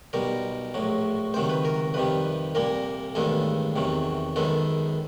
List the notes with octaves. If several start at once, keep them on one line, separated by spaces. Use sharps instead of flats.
B1 B2 G3 A#4
A#1 A2 F#3
C#2 C3 D#3 F#3 C5
B4
A#4
F2 C3 D#3 G3 B4
C2 A#2 G3 A#3 A#4
A1 G2 D#3 G#3 B3 A4
E2 C3 D#3 F#3
F#2 D#3 G#3 B3 A4